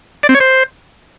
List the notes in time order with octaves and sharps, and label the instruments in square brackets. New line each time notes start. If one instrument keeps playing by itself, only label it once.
[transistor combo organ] D5
C4
C#5
C5